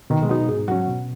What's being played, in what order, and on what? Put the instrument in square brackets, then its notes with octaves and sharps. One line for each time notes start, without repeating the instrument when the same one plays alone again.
[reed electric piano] B2 [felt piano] D#3
[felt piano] G#3
[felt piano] F#3 [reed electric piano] B3 D#4
[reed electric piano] G#2 [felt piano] G#4
[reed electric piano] F#3 C#4 [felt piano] F#4
[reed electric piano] B2